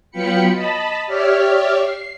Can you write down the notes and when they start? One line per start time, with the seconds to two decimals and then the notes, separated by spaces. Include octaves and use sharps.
0.11 F#3 B3 F4 G5 B5 C#7
0.52 D#5 A5 B5
1.07 G4 C#5 D5 E5 F6
1.78 C7